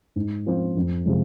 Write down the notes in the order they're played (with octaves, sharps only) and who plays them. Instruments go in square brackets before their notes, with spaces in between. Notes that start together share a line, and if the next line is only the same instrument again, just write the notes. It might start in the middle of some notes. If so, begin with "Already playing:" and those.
[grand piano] G#2
F3 C4 F4 C5
F2
C3 F3 G#3